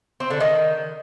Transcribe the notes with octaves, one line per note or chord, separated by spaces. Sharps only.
C4
D3
D#3